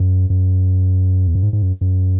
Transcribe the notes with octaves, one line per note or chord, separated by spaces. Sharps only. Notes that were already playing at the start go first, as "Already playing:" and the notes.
Already playing: F#2
F#2
E2
F#2
G#2
G#2
F#2
F#2